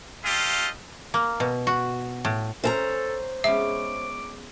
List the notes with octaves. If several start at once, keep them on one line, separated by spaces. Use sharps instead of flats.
F4 G4 A4 D#5 F5
A#3
B2
F#4
A2
C#4 A4 A#4 C5 A5 A#5
G#3 B3 C#4 E5 D6